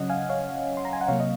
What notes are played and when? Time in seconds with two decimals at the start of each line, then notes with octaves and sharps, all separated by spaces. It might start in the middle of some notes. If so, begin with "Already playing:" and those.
Already playing: C#3 F#3 C#4 D#5 F#5
0.10 F5 G#5
0.29 C#5 F5
0.77 C6
0.85 A#5
0.93 G#5
1.01 F#5
1.08 C3 F#3 A#3 C#5 F5
1.20 D#5